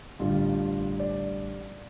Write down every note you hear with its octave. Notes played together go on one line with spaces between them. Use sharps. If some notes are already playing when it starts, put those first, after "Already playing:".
A1 G2 D3 G3 F4
D5